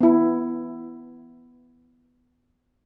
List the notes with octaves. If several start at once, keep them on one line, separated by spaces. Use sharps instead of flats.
B3 E4